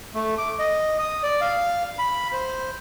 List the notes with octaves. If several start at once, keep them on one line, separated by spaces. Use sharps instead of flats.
A3
D6
D#5
D#6
D5
F5
B5
C5